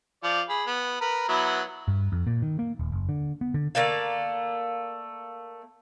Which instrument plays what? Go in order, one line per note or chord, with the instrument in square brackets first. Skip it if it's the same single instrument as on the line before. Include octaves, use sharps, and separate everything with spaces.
[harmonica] F3 D5 F5
G#4 B5
B3
A#4 B4 B5
F#3 B3 E4
[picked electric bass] G2
F2
A#2
D#3
A#3
D#1
F#1
D3
B3
D3
[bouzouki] A3 A#3 D5 F5